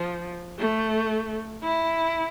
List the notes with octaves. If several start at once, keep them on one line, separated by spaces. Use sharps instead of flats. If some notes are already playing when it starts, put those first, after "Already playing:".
Already playing: F3
A3
E4